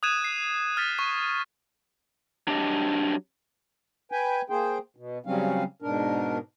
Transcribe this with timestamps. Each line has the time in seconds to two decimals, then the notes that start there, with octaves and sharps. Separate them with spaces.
0.03 D#6 F#6 G#6 D#7 E7
0.24 C7
0.77 F6 A6 B6
0.99 C#6
2.47 F#3 D4 G4 D#5
4.12 B4 G5 G#5
4.50 A#3 G#4 C5 G5
4.96 B2
5.26 C#3 F#3 G3 C4 C#4 F5
5.82 G#2 B2 D4 A#4